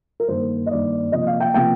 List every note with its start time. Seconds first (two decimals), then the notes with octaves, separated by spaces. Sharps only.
0.20 A#4
0.28 G2 D#3 A#3 C5
0.66 D#5
0.70 G2 D#3 A#3 D5
1.12 C3 F3 A#3 D#5
1.27 F5
1.40 G5
1.54 C3 F3 A#3 G5